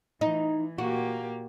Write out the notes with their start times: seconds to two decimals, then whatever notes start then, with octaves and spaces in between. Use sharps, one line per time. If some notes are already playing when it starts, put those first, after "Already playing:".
0.21 E3 D#4
0.78 A#2 A#3 F#4 G4